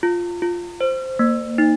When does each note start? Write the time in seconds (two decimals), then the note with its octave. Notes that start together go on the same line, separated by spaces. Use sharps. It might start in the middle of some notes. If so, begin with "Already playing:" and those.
0.03 F4
0.42 F4
0.81 C5
1.19 A#3
1.58 D#4